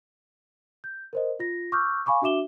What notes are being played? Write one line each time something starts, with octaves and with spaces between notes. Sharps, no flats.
G6
A#4 C5 D#5
F4 A#6
C#6 D6 E6 F6 G6
F5 G#5 B5 C#6 D6
D4 F#4 E5 D6 E7 G7